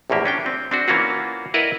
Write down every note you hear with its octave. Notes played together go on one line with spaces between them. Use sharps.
A#1 E2 A2 A#3 G4
C#4 D4 G5
C4
C4 D4 F#4
E3 A#3 C#4 F4 F#4
E4 A#4 B4 D5 D#5 F#5